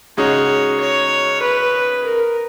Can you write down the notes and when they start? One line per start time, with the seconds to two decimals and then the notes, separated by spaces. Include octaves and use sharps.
0.17 C#3 G#3 D#4 F#4 C#5
0.80 C#5
1.42 B4
2.05 A#4